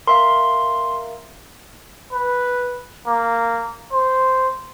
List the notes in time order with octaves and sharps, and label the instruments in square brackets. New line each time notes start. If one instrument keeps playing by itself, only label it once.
[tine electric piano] A#4 E5 F5 [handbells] C6
[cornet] B4
A#3
C5